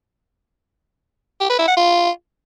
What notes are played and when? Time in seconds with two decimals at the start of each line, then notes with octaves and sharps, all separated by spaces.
1.40 G4
1.49 B4
1.59 E4
1.68 F#5
1.77 F4